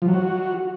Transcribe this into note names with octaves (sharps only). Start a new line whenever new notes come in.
F3
F#3
F#4